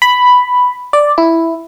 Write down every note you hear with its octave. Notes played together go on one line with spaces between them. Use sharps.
B5
D5
E4